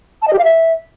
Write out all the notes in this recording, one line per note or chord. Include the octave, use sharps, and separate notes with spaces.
A5
D#5
G4
F5
E5